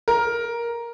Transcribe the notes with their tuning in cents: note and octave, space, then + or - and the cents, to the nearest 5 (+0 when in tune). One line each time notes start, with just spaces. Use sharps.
A#4 +10